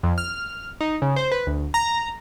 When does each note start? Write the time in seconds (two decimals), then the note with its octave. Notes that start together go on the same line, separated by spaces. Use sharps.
0.03 F2
0.18 F6
0.81 D#4
1.02 C#3
1.16 C5
1.32 B4
1.47 D2
1.74 A#5